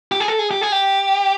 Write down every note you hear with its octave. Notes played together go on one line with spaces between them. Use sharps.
G4
G#4
A4
G#4
G4
G#4
G4